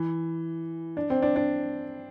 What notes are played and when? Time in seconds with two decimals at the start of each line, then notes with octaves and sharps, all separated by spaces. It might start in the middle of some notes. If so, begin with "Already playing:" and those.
Already playing: E3
0.97 D4
1.10 C4
1.22 D4
1.36 D4